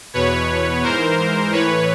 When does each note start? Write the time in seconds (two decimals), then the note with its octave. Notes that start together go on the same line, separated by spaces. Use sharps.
0.13 E2 B2 B4 C#5
0.83 G#2 E3 A#4 C5
1.52 A2 E3 B4 C#5